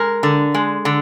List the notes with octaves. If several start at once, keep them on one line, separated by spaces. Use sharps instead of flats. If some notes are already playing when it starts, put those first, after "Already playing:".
Already playing: G#3 A#4
D3
G#3
D3